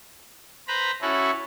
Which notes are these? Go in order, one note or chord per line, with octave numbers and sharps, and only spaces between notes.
B4 C5 A#5 B5
C#4 E4 F#4 A4